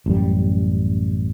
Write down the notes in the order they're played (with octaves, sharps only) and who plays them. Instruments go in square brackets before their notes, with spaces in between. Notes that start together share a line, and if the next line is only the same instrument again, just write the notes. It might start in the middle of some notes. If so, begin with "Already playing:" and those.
[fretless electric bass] A1 F#2 G3